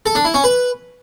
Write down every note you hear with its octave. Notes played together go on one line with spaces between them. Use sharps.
A4
D4
E4
C#4
B4